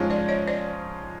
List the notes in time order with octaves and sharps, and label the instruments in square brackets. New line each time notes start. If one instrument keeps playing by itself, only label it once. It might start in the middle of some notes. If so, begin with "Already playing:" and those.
Already playing: [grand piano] G#2 F3 G#3 C#4 F4
[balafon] C5 D5
C#5 D#5
C5 D5